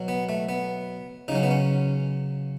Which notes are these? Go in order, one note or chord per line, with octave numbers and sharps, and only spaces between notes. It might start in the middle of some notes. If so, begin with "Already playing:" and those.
Already playing: B2 F#3
B3
A3
B3
C#3 F#3 C#4 D#4
B3
C#4